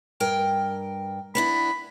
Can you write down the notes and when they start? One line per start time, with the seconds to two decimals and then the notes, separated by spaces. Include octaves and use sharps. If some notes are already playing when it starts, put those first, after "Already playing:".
0.20 G2 A#4 G5
1.35 B3 D4 E4 B5